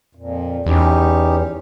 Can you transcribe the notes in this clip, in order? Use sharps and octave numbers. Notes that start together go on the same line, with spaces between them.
F2 A#2
E2 C#4 D#4 G4